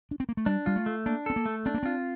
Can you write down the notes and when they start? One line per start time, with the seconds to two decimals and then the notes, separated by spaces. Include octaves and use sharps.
0.11 D4
0.20 C4
0.29 A#3
0.37 A3
0.46 G3 D4
0.66 G3 F4
0.76 A3
0.86 A3
1.06 A#3 D4
1.26 C4 A4
1.36 A#3
1.46 A3
1.66 C4 D4
1.74 A#3
1.83 C4 F4